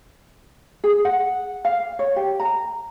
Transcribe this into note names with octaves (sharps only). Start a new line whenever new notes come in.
G#4
F#5
F5
C#5
G4
A#5